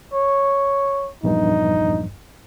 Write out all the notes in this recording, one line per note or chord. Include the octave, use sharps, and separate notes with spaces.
C#5
A#1 E2 G2 D#4